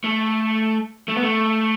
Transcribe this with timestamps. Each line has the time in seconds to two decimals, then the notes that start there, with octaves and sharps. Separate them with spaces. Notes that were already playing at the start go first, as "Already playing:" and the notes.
0.04 A3
1.08 A3
1.16 B3
1.23 A3